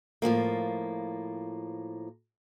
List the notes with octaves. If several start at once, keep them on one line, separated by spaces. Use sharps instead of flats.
A2 F3 F#3 A#3